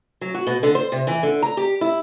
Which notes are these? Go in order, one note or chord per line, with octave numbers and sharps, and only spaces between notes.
F#3
F#4
B2
D3
C5
C3
E3
D3
A#5
G4
E4